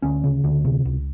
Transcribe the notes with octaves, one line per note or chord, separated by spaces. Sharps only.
D2 C#4
C#3
D2
C3
C#2